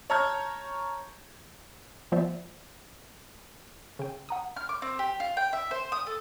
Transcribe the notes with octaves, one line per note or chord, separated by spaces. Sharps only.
C#5 A5 A#5 F6 G6 G#6
F3 B3 F4 C5 D5 E5
C#3 G5
F#5 A#5 D#6
F6
D6
C4
G4
F4
G5
E5
C5
D#6
A4